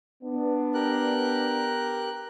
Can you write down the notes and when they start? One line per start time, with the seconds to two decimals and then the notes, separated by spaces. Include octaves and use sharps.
0.23 B3 D4
0.74 G4 A#4 F#6